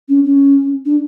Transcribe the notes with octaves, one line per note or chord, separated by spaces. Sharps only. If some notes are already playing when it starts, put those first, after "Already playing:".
C#4
C#4
D4